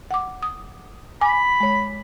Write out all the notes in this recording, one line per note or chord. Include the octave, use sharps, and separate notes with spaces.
F#5 D6
D#6
G#5 B5 D6
G#3 C#5